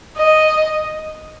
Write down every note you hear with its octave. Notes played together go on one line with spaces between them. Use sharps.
D#5